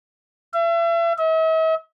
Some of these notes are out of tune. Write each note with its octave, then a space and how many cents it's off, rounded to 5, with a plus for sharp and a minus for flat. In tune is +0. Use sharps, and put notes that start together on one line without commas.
E5 +40
E5 -45